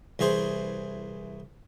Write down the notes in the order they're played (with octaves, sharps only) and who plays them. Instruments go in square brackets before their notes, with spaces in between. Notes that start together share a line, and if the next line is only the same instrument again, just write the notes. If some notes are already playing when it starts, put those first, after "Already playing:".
[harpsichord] C2 E3 G#4 C5